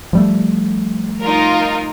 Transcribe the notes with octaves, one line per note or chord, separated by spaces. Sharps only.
F3 G3 A3
D#4 F4 A#4